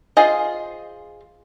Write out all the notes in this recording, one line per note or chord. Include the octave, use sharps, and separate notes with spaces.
F4 G#4 C5 D#5